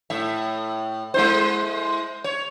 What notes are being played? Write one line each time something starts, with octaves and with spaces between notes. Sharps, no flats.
A2 E5
G#3 E4 C5
C#5